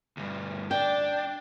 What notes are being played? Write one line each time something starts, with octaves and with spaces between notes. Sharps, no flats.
D2 G2
D4 G5